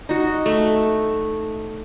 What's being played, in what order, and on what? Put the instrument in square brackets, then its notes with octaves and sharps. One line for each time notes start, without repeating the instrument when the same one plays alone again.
[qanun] D#4 F#4
A3